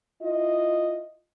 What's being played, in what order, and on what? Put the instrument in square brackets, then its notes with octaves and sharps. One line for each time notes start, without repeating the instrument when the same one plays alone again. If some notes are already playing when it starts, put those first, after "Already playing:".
[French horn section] E4 F4 D#5